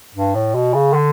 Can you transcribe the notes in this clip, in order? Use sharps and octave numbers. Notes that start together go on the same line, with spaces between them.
G2
A2
B2
C#3
D3